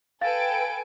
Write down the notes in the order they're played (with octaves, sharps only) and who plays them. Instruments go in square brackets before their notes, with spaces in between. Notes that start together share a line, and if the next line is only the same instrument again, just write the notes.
[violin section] A4 B4 D7 [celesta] F5 A6 [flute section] G5 G#5